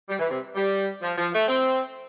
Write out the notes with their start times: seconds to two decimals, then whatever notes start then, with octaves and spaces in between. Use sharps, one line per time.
0.09 G3
0.19 E3
0.30 C3
0.56 G3
1.02 F3
1.18 F3
1.34 A3
1.48 C4